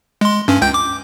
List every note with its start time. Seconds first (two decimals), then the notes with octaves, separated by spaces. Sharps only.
0.21 G#3 C6
0.48 G2 C#4
0.62 C#2 G5 G6
0.74 D6